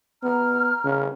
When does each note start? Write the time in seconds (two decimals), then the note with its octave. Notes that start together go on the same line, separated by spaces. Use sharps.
0.23 B3 A#5 F6
0.85 C#3